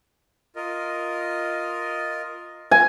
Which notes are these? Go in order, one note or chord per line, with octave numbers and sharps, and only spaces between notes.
F4 A#4 D#5
F4 A#4 G#5 A#5